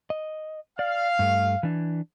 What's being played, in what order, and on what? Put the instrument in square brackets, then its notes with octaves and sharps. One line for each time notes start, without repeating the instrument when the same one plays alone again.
[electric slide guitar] D#5
[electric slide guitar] D5 [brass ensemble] F5
[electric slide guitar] G2 A3
E3 D4